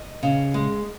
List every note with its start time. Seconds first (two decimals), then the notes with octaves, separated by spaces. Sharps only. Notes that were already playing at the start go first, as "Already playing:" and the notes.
Already playing: D#5
0.23 C#3
0.54 G#3